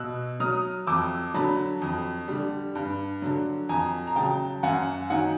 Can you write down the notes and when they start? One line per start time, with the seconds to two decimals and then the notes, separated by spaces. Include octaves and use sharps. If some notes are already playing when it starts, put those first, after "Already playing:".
Already playing: B2 E6 F#6
0.40 F#3 D#6 F6
0.87 F2 D6 E6
1.34 D3 F#3 A5 B5
1.82 F2
2.28 D3 G3
2.75 G2
3.22 D3 F#3
3.69 F2 G#5 A#5
4.07 A#5
4.16 C#3 F#3 G5 A5
4.63 F#2 F#5 G#5
5.10 D#3 F#3 F#5 G#5